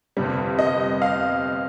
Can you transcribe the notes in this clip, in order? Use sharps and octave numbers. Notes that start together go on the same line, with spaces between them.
G1 F2 C3 G3
D#5
F5